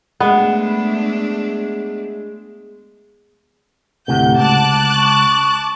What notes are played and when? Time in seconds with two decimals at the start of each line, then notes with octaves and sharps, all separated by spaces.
0.20 G#3 A3 B3 D4
4.08 D2 A2 C3 F#5 G6
4.38 C#2 A5 D6 F#6
4.94 C#6